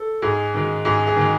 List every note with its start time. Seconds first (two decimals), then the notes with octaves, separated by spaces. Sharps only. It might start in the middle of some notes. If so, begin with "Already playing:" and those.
Already playing: A4
0.22 G#2 G#4
0.54 D#3 G#3
0.85 G#2 G#4
1.07 G#4
1.16 D#3 G#3